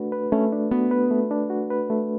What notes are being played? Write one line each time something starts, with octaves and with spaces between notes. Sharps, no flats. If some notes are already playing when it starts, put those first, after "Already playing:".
Already playing: A3 D4 F#4 B4
B4
A3 C#4
D4
B3 F#4
B4
A3
D4
F#4
B4
A3